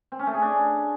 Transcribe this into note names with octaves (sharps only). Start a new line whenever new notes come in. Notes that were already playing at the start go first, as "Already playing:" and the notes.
C4
C#4
A3
G#4
D4